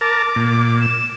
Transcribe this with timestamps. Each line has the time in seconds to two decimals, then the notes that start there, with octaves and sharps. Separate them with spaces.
0.01 A#4 A5 D6
0.36 A#2
0.80 E7